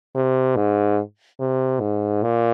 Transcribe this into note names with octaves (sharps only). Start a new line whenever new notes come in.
C3
G#2
C3
G#2
A#2